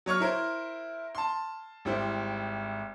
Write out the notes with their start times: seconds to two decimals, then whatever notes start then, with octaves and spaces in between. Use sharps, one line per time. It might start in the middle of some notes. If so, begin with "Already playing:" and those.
0.06 F#3 C#5 C#6 F6
0.20 E4 A#4 C5
1.15 A5 C6
1.85 G#1 G3 E4 C5